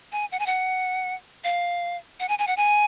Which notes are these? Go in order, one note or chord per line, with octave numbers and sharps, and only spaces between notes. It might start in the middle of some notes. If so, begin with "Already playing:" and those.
G#5
F#5
G#5
F#5
F5
F#5
G#5
G#5
F#5
G#5